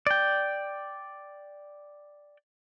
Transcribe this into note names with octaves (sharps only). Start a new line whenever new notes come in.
D5 G5